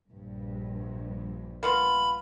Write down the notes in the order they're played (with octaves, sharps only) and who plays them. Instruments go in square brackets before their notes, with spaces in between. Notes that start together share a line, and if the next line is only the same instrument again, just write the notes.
[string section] A#1 G2
[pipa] A#3 B3 F4 [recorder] B5